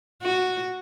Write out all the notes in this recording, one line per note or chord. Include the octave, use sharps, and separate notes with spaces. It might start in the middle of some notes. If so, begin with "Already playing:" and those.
F#4